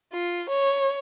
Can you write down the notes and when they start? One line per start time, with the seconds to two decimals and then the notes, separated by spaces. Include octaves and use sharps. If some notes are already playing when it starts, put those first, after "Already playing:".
0.12 F4
0.50 C#5